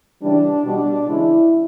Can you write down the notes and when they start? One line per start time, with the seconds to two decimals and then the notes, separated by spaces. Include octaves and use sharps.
0.22 C#3 E3 G3 D4
0.65 B2 G3 D4
1.08 C#3 E3 G#3 E4